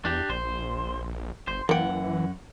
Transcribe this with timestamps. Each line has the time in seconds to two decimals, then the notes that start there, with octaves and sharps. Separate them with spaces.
0.05 E2 D4 G4
0.30 A#1 C5
1.48 G1 C5
1.69 F#2 E3 A#3 F#5 G5